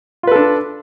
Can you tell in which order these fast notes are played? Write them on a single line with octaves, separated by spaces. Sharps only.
F4 B4 A4 D4